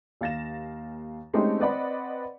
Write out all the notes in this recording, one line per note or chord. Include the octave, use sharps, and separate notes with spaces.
D#2 F5 A6 A#6 E7
G#3 A3 C4 C#4 D#4 G4
C4 B4 D5 D#5 F#5 B5